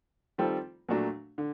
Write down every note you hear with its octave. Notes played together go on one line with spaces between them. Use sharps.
D#3 G3 C4 F4 A4
A#2 F#3 A3 D4 F#4
D3